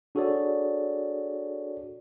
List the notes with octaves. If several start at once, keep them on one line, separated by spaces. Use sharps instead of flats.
D4 F#4 G#4 A4 C#5 D5